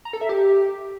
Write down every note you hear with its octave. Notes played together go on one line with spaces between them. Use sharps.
A#5
A4
E5
G4